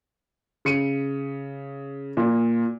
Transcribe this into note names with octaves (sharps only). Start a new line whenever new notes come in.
C#3 C#7 D#7
A#2